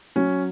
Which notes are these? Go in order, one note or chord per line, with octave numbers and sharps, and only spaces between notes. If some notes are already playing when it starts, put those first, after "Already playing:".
F#3 C#4